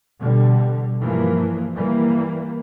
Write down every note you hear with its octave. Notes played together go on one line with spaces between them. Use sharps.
B2 D3 G3
G2 E3 F3 A#3
E3 G3 A#3